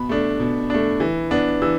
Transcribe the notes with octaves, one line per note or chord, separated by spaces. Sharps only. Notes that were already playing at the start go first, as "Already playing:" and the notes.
Already playing: B2 B5
A3 D4
B2
A3 D4
E3
B3 D4
E3 E6